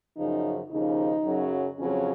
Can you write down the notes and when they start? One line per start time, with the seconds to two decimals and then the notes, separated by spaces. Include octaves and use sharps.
0.16 F#2 C#3 F3 D#4
0.70 D#2 C#3 F3 D#4
1.24 F#2 C#3 F#3
1.77 F2 C#3 F#3 C#4